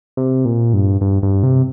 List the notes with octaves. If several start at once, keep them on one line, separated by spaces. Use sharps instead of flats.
C3
A#2
G2
G2
G2
C3